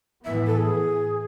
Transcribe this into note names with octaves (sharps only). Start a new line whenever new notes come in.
A2 E3 B3 E5
A4
G#4